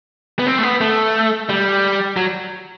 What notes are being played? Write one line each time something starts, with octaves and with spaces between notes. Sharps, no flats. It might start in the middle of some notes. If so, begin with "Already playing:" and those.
B3
C4
A3
B3
A3
G3
F#3